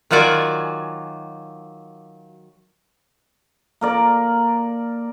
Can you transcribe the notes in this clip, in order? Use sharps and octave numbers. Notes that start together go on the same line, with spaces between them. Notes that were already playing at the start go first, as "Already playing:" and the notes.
D#3 F#3 F4 F#4 D5 G#5
A#3 A#4 D5